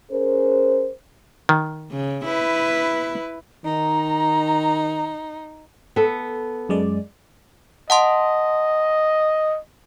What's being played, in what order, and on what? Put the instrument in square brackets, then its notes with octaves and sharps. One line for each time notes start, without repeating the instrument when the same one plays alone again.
[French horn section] C#4 G#4 A#4 C5
[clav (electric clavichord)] D#3
[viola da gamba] C#3
E4 B4
[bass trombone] D#3 [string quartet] D#4 [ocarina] A#5
[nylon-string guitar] B3 A4
[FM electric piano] F#2 G#3 D5
[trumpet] D#5 [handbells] F#5 A5 C6